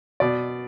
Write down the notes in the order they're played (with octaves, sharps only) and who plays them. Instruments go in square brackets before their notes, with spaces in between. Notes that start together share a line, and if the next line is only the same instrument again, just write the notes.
[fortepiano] B2 D5